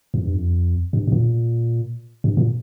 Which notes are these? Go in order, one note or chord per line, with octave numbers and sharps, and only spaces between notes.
F2
G2
F2
G2
G2
A#2
G2
A#2